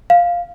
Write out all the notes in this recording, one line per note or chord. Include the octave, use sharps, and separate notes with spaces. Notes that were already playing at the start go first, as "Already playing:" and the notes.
F5